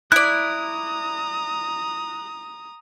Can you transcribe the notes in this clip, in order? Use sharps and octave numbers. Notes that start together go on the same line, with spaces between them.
E4 D5 A#5 D#6 F#6